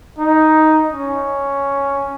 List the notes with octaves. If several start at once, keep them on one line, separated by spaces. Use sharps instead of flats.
D#4
C#4